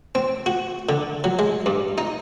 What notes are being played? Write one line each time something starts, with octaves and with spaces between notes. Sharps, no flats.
C4
F#4
D3
F#3
G#3
G2
D#4